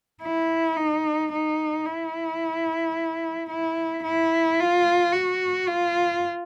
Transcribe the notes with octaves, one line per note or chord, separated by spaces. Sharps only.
E4
D#4
D#4
E4
E4
E4
F4
F#4
F4